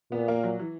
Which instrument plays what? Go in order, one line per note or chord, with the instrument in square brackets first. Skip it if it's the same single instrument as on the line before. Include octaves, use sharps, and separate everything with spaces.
[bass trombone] A#2 [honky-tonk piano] B3
[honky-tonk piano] A#3
F#3
E3